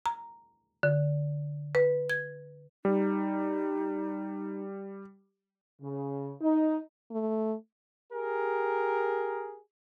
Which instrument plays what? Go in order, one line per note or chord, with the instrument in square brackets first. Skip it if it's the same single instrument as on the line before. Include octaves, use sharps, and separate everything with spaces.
[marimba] A#5
D3
B4
G#6
[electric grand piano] G3 [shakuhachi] D#4
[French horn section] C#3
D#4
[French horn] A3
[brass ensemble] G4 G#4 A#4